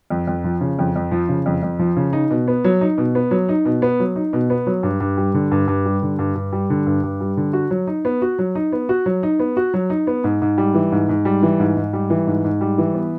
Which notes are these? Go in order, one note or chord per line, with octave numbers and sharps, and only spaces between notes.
F2
F2
F3
C#3
F2
F2
F3
C#3
F2
F2
F3
C#3
D#4
B2
B3
F#3
D#4
B2
B3
F#3
D#4
B2
B3
F#3
D#4
B2
B3
F#3
G2
G2
G3
D3
G2
G2
G3
D3
G2
G2
G3
D3
G2
G2
G3
D3
F#4
F#3
D#4
B3
F#4
F#3
D#4
B3
F#4
F#3
D#4
B3
F#4
F#3
D#4
B3
G#2
G#2
G3
E3
G#2
G#2
G3
E3
G#2
G#2
G3
E3
G#2
G#2
G3
E3
B3